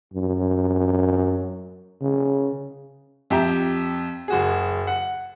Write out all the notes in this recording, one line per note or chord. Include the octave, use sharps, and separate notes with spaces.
F#2
C#3
F2 G4 E5 G5 A#5
F#1 F#4 G#4
F#5